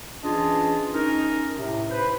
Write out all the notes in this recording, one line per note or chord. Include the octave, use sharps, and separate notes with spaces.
E3 C#4 D4 F4 G#4 D#5
C#4 D#4 A#4
A2 C3
B4 C5